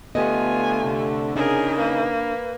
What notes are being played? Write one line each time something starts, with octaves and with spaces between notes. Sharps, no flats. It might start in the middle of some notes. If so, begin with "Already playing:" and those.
D3 A3 B3 F4 G4 D#5 G#5
C3
C#3 D4 D#4 G#4 A#4
A#3 B4